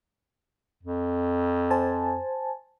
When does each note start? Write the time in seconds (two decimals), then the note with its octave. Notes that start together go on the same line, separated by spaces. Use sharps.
0.83 F2
1.71 C5 G#5 A5